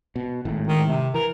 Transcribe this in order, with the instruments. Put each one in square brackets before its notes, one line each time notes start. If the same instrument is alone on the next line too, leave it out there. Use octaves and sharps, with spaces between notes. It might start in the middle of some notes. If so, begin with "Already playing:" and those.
[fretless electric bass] B2
G#1 A2
[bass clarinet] D#3
C3
[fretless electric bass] E3 [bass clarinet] A#4